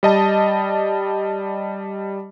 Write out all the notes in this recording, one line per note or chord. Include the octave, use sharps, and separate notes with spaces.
G3 D#5 A5